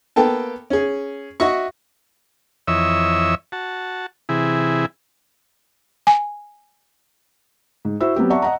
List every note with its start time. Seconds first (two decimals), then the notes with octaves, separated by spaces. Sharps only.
0.16 A#3 B3 A4 G5 A5
0.70 C#4 G#4
1.40 F#4 D#5 E5 C#6
2.68 F2 E3 C#5 D#5 E5 E6
3.52 F#4 A5
4.29 C3 E3 E4 G#4
6.07 G#5
7.85 G#2
8.01 E4 F#4 C5 E5 E6
8.16 F#3 B3 C4 G4
8.30 D5 E5 F#5 A5 A#5 C#6
8.42 D#5 F#5 A#5